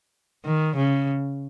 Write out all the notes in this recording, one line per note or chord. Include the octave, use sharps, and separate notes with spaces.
D#3
C#3